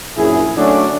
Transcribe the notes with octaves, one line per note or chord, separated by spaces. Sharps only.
A#1 F#2 E4 G#4
D3 F#3 A3 C#4 D4